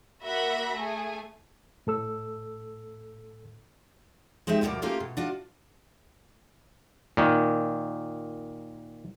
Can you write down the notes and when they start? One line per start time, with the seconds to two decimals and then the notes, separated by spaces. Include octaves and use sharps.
0.23 A#3 F#4 E5 B5 A#6
0.76 A3 G#4 G#5
1.87 A2 A4 E6
4.47 G#3 C4 D#4 G4 E5
4.61 D2 G2 B2 F3 A#3 D5
4.82 A3 A#3 C#4 F4 G4 A#4
5.00 B2
5.17 D4 F4 F#4
7.17 A#2 D#3